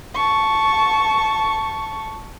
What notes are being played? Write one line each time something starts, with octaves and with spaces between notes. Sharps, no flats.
A5 C#6